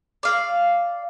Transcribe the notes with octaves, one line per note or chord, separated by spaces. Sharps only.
D5 F5